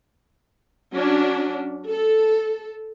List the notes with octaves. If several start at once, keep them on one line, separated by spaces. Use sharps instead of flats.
F#3 C#4 D4
A4